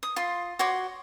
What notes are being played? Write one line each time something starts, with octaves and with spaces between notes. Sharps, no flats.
D#6
F4 C6
F#4 C#5 C6 D6